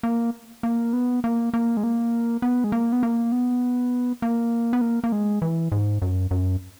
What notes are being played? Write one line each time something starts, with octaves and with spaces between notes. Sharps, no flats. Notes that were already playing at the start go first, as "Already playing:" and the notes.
A#3
A#3
B3
A#3
A#3
G#3
A#3
B3
G#3
A#3
B3
A#3
B3
A#3
B3
A#3
A#3
G#3
E3
G#2
F#2
F#2